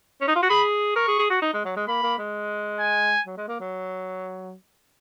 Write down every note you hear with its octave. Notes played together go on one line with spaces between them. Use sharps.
C#4
D#4
F4
F#4
G#4 B5
A#4 C#6
G#4
G#4
F#4
D#4
G#3
F#3
G#3
A#3 B5
A#3
G#3
G#5
F#3
G#3
A#3
F#3